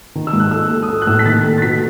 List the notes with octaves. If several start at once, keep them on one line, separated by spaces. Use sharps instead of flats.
D#3
E6
G#2
F#6
A3 E6
A3
D#6
A3 E6
F#6
A2 E6
F#6
B6
D#3 A6
A3
A6
B2 B6